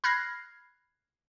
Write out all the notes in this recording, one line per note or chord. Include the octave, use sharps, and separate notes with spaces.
B5 F6 F#6 G#6 A#6 C7